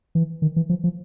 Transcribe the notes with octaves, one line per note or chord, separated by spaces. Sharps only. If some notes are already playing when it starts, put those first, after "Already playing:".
E3
D#3
E3
F3
F3